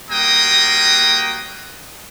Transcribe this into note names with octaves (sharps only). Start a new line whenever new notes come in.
G3 A#3 F#4 G5 A#5 D#6